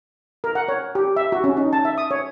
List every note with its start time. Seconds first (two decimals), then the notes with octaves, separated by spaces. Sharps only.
0.44 A#4
0.55 F#5
0.68 C#5
0.95 G4
1.16 E5
1.32 F#4
1.44 C#4
1.57 D#4
1.73 A5
1.85 E5
1.98 D#6
2.11 C#5